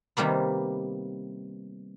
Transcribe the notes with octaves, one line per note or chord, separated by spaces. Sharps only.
C3 D#3 G3 A#3 B3